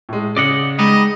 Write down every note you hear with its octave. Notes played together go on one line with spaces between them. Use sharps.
A2 G#3
C#3 D5 D#5 F#5
G3 G#3 B3 D#4 D#5